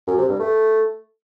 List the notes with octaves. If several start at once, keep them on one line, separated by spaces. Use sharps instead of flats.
F#2
C3
G2
A3